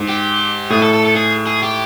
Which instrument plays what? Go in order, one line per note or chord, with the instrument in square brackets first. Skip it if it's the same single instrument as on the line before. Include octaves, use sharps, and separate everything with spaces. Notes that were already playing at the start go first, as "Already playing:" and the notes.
Already playing: [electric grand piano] G#2
[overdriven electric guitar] G4
[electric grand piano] A2 [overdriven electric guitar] G#4
[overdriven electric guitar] A4
A4
A4
G#4
G#4
G4